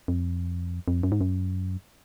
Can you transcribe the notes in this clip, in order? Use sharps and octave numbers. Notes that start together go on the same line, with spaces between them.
F2
F2
F#2
G#2
F#2